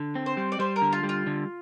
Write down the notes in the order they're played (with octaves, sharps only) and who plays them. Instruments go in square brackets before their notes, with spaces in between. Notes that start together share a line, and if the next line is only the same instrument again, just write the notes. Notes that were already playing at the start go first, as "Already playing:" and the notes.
Already playing: [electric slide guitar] D3
C4
[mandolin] C5
[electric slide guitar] G3
[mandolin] D5
[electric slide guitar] G3 [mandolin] C5
[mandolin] A#4
[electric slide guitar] D3
[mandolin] F4
[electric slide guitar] G3
[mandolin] F4
[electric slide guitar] D3